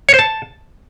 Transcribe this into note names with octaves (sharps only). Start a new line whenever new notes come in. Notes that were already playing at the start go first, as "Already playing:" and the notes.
C#5
C5
A5